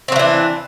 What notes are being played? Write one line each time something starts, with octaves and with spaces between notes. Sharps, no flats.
E3 F#3 C4 D4